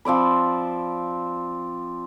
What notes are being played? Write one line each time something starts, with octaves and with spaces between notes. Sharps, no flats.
F3 C4 D5 B5